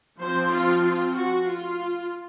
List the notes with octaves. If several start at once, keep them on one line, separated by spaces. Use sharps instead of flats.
F3 C4 C5
F4
F4
F#4
F4